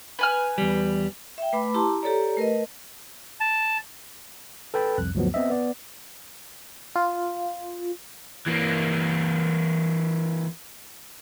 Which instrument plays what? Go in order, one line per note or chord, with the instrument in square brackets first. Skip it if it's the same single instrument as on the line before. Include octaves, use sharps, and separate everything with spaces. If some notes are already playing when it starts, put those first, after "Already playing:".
[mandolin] B4 G#5 F6
[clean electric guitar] E2 G3
[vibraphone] E5 G5
A3 B4 B5 D6
E4 G4 A5 A#5 C6 D6
G4 A4 C#5 D5 A#5
A3 A#4 B4 D#5
[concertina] A5
[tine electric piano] A4 B4 G5 A5 B5
C2 F2 F#6
D2 G2 F3 F#3 B3
B3 C4 D#5 E5
B3 D5
[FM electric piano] F4
[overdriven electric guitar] E3 A#3